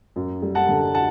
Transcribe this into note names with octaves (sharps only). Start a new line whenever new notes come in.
F#2
G3
F#5 A5
D3
F#5 A5